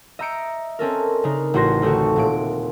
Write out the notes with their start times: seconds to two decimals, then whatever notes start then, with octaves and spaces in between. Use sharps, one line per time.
0.19 D#5 E5 A#5 G6 C#7 D7
0.79 C4 C#4 A4 A#4
1.24 C#3 D4 D#4 A#4
1.54 A1 F#4 C5 C6 A#6
1.82 D2 A3 C4 D#4 F#4 C#6
2.16 D#1 A#2 D7